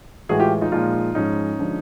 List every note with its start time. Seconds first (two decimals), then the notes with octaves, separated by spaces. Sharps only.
0.29 A2 E3 G#3 F#4 G#4
0.40 F4 G4
0.61 D#4 F4
0.72 A#2 F3 G#3 D#4 F4
1.15 G#2 F3 G#3 C#4 D#4
1.59 D3 F3 G#3